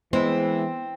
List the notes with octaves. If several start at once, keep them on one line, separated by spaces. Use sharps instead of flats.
E3 G#3 B3 C4 E4